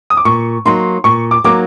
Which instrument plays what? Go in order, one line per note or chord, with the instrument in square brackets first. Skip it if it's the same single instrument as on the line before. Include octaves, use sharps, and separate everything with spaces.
[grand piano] D#6
D6
[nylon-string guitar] A#2 [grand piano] C#6
[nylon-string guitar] F#3 A#3 D#4 [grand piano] C6
[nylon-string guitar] A#2 [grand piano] C#6
[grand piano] D6
[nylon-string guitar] F#3 A#3 D#4 [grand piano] D6